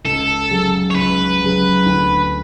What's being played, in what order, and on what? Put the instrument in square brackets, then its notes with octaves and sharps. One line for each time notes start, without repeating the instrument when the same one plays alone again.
[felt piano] C#2 [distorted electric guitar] A4
[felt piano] C#3 F#3
[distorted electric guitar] C#5
[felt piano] C#2 [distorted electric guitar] B4
[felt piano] C#3 F#3
D2